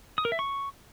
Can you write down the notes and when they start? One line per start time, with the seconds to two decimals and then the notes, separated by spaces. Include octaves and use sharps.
0.18 D#6
0.25 A#4
0.32 E5
0.39 C#6